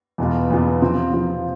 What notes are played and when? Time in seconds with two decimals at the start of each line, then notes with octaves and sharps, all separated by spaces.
0.18 E2 B2 B3 F4
0.50 E2 B2 B3 F4
0.82 C3 F3 C4 F4
1.13 C3 F3 C4 F4